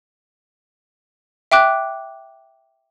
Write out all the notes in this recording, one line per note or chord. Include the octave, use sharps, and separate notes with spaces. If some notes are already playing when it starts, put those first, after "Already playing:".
E5 G5 D6 F#6